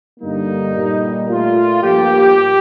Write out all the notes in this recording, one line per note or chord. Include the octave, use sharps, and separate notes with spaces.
G2 D3 G3 A#3 D#4
A#2 G3 A#3
A#2 A3 F4
G2 F3 A#3 G4